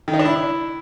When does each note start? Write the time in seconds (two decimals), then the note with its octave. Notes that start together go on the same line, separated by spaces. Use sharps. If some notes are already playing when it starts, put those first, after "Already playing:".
0.08 D#3
0.14 D#4
0.19 D4
0.25 E4